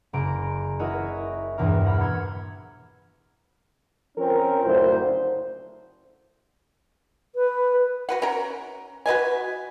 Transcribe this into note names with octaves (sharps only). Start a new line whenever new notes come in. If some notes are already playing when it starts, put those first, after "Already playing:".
F#1 A#5 C6 D7
E4 F#4 A#4 C#5 D#5 E5
A#1 E2 G2 B2 E4 A#4
F#5 A#5 B5 F6
B5 C6 E6 G#6 C#7
F3 C4 C#4 A#4
F#1 D2 A2 C5
B4
F#4 B4 F#5
C#4 A#4
F#4 B4 D#5 G#5